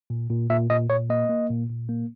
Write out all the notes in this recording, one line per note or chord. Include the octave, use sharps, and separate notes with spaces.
A#2
A#2
A#2 E5
A#2 D#5
A#2 C#5
A#3 D#5
A#3
A#2
A#2
A#3